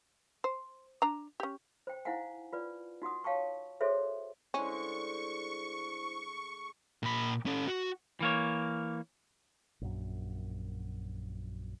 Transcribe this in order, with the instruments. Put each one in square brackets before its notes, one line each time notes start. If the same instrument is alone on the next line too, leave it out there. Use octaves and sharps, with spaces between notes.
[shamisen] C5
D4 A#5
C#4 G4
[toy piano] C5 G5
D#4 E4 C5 F5 F#5 G#5
F4 B4 D5
D#4 F#4 F#5 D#6
C#5 F5 G5 A5 C#6
F#4 G#4 A4 C5 C#5 E5
[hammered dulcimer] D3 G#3 A3 [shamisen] C#4 [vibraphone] E4 C5 [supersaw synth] C#6
[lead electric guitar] A#2 B5
C#4 A4
F#4
[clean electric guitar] E3 A#3 C#5
[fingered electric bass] A#1 F#2